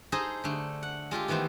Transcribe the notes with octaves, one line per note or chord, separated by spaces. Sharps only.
D#4 G#4 A4 C5 D#5
D3 A3
F#5
G#3 F4 G4 A4
D#3 E3 A3 B3 C5